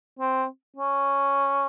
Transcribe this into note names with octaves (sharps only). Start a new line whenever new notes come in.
C4
C#4